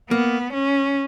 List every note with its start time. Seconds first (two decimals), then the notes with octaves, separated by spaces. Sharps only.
0.11 A#3 B3
0.53 C#4